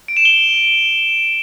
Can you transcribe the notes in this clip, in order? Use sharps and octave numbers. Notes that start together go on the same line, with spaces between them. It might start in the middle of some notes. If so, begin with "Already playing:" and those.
D7
E7
G7